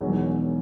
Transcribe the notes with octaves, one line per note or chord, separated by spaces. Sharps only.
E1 E2 D#3 F#3